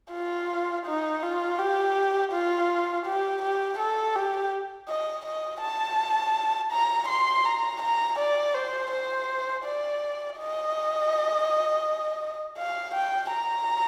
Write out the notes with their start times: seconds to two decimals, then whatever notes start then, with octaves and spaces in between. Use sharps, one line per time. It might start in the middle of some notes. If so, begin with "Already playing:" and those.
0.13 F4
0.86 D#4
1.22 F4
1.59 G4
2.32 F4
3.06 G4
3.42 G4
3.79 A4
4.15 G4
4.88 D#5
5.26 D#5
5.62 A5
6.72 A#5
7.08 C6
7.45 A#5
7.82 A#5
8.19 D5
8.55 C5
8.91 C5
9.64 D5
10.38 D#5
12.58 F5
12.94 G5
13.31 A#5